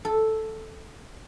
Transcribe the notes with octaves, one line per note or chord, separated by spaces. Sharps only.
A4